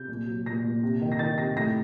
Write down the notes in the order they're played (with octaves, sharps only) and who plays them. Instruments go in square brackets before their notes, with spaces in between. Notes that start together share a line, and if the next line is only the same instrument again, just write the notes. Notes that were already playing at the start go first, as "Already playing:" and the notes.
Already playing: [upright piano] C3 G6
A#2
F#3
A#2 A#6
A#2
C3
D#3
A#6
D#3 A6
C3 A#6
A2 A#6